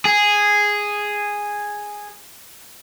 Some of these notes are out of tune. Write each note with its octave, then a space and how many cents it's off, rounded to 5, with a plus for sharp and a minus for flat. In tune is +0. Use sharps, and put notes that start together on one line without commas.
G#4 -5